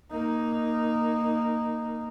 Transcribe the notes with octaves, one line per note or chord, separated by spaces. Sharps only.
A#3 D#4